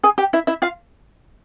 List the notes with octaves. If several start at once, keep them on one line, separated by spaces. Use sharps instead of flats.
G#4 G#5
G4 G5
E4 E5
E4 E5
F4 F5